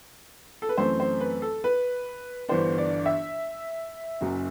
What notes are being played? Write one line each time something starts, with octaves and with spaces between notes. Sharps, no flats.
A4
B4
F#2 E3 A3 C4 C5
C5
B4
A4
B4
G1 G2 E3 B3 D4 C5
D5
E5
F#1 F#2 F#3